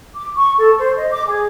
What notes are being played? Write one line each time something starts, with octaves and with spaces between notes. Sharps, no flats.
D6
C#6
A4
C5
D#5
D6
G#4